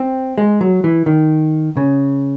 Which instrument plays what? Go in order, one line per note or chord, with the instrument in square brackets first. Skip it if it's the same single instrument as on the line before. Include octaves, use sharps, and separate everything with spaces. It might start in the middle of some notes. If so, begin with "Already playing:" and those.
Already playing: [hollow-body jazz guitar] C4
G#3
F#3
E3
D#3
C#3